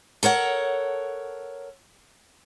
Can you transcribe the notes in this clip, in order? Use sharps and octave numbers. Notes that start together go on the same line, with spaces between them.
A4 A#4 C#5 F#5